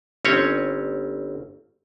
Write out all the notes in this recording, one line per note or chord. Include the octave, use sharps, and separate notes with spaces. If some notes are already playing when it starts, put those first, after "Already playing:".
G1 C4 C#4 C#5